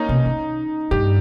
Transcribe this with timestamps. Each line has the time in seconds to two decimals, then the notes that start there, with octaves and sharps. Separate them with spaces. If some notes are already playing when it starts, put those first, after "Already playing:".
Already playing: A#3 C#4 D#4
0.09 C3
0.26 C#3
0.91 G2 G4